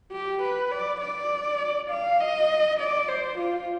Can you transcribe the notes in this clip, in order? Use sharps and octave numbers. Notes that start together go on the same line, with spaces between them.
G4
B4
D5
D5
F5
D#5
D5
C5
F4